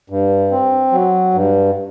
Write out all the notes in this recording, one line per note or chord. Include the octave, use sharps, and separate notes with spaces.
G2
C4
F#3
G2